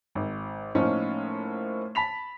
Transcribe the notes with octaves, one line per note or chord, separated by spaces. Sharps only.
G#1
A2 F3 A#3 C#4 D#4
A5 B5 B6 F7